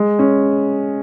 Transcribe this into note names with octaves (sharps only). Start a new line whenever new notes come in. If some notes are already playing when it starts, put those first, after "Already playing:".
Already playing: G#3
C#4